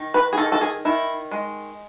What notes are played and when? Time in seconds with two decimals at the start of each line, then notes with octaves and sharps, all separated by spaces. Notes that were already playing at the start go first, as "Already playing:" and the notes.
Already playing: D#3
0.14 B4
0.33 G#4
0.38 D#3 A4
0.52 A4
0.61 G#4
0.85 D#3 E4
1.31 G#3